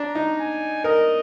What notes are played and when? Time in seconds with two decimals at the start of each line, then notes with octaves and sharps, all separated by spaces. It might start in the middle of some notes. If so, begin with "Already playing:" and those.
Already playing: D4 A#5
0.15 D#4
0.39 G#5
0.84 A#4 D#5